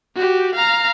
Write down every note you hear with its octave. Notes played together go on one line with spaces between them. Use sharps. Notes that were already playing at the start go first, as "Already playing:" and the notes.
F#4 G4
F5 A#5